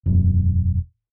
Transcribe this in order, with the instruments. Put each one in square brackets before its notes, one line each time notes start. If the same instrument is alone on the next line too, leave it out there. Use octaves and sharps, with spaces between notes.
[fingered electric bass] E1 F#2